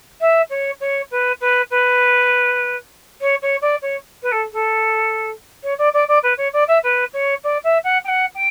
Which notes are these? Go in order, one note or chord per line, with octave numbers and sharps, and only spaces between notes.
E5
C#5
C#5
B4
B4
B4
C#5
C#5
D5
C#5
B4
A4
A4
C#5
D5
D5
D5
B4
C#5
D5
E5
B4
C#5
D5
E5
F#5
G5
F#5
G5